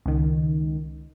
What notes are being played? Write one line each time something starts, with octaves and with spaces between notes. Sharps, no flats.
C#2 D#3